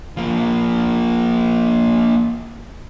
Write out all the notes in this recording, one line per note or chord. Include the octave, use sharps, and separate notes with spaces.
F3 A#3